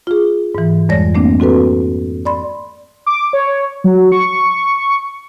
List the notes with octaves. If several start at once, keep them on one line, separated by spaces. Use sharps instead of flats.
F4 G#4
G#2 E3
F2 G3 G#3 C#5 D5 A#6
A3 A#3 C4 D4
C4 F#4 A4 B4
D5 B5 C6
D6
C#5
F#3
C#6